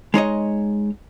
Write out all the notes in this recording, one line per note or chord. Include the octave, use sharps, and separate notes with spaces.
G#3 D#4 C#5 D#5